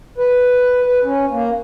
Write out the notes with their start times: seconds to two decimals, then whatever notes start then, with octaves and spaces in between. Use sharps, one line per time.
0.18 B4
0.86 B4
1.03 C#4
1.31 A#3